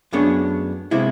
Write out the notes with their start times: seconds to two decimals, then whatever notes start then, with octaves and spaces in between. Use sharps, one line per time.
0.13 F#2 A3 B3 D4 G#4 C#5
0.91 C3 G#3 B3 E4